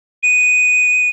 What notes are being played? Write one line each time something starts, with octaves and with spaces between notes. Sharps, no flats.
D#7